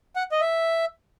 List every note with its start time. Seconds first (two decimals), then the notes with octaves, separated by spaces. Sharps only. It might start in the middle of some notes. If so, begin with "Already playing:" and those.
0.16 F#5
0.32 D#5
0.41 E5